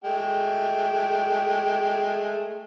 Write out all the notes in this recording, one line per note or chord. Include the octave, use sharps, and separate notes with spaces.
G#3 A3 G5